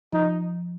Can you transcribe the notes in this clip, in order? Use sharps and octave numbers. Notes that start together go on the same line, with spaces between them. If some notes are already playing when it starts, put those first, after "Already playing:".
F3 D#4